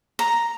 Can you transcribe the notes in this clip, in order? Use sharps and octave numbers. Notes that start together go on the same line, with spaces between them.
A#5